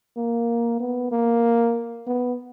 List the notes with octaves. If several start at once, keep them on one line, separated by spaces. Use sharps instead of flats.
A#3
B3
A#3
B3